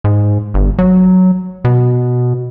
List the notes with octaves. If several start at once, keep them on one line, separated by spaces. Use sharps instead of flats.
G#2
G1
F#3
B2